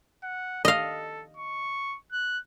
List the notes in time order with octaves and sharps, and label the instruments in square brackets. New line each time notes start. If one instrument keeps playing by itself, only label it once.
[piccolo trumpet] F#5
[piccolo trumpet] A4 [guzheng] D#5 F5
[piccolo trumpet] C#6
F#6